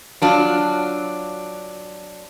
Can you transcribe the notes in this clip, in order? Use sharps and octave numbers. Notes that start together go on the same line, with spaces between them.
F#3 D4 F4